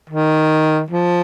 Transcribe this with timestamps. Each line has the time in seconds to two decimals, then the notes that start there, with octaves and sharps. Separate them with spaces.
0.10 D#3
0.90 F3